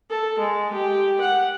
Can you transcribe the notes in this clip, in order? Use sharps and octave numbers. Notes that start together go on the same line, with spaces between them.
A4
G#3
G4
F#5